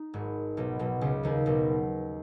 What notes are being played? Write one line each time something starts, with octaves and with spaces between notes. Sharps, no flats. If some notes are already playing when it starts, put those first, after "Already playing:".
Already playing: D#4
G#1 G#2
B1 B2
B1 B2
C#2 C#3
D#2 D#3
B1 B2